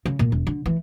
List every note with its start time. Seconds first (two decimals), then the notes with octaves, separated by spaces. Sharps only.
0.06 C#3
0.19 A#2
0.32 E1
0.47 D3
0.66 E3